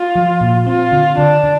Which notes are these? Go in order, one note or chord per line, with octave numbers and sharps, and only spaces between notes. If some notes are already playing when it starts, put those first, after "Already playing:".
Already playing: F4
F3
A#2
C4 F4
D3
D3 D4
D3